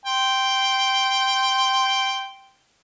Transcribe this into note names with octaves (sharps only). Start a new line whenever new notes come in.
G5 C6